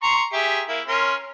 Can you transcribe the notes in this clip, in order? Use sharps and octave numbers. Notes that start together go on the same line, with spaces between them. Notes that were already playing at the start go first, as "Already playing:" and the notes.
A#5 C6 C#6
G4 G#4 E5
A#3 E4
C#4 A#4 C6